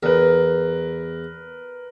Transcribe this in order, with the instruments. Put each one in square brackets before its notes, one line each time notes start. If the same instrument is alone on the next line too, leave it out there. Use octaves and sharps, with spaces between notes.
[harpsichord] E2 [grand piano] A#4 B4